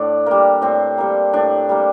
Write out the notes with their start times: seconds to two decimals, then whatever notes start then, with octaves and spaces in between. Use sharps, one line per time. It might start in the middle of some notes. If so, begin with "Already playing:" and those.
Already playing: A2 D4
0.26 G3 A#3
0.62 A2 C4
0.98 G3 A#3
1.33 A2 D4
1.69 G3 A#3